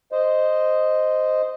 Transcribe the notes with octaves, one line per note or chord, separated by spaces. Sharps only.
C5 D#5